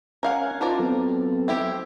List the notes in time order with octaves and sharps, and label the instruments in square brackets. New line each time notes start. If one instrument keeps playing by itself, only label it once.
[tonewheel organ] C#4 G#5 [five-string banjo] A#4 F5 F#5
[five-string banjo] F3 A#4 D5 [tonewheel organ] D#4 [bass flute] F4
[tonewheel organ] F#3 B3 A4 [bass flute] C4
[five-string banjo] C4 E4 G4